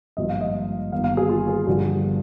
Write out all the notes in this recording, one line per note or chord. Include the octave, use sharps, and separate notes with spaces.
G#1 G2 F3 A#3 D#5
F5
D#5
G1 G2 D#3 A#3 F5
F5
G#4
F4
G#4
G2 D3 F3 G#4